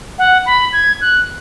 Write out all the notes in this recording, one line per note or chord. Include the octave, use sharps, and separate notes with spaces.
F#5
B5
G#6
F#6